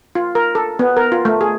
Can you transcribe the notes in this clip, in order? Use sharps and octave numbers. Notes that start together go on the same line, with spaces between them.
F4
A#4
A4
B3
A#4
F4
A3
G#4